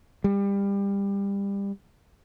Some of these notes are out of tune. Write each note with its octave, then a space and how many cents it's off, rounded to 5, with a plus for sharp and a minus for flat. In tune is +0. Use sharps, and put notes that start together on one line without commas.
G3 +25